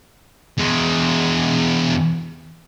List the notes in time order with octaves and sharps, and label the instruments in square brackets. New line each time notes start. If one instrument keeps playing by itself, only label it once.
[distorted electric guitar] E2 G#3